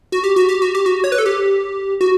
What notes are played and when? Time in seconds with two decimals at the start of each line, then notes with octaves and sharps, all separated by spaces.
0.12 F#4
0.24 G4
0.36 F#4
0.49 G4
0.62 F#4
0.75 G4
0.86 F#4
1.04 C#5
1.12 B4
1.18 A4
1.26 G4
2.01 F#4